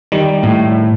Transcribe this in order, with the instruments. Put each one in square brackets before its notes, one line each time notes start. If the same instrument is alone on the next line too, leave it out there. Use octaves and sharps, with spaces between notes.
[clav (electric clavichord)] D#3 G3
[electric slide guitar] A2